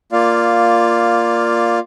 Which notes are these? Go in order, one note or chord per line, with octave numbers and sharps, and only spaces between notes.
A#3 F4 D5 F5